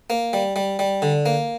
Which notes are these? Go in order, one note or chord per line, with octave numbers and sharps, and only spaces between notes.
A#3
G3
G3
G3
D3
A#3